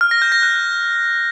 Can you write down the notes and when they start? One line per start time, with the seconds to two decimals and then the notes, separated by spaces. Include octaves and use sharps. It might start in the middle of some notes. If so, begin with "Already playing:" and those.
0.01 F6
0.11 A#6
0.22 G6
0.32 A#6
0.42 F#6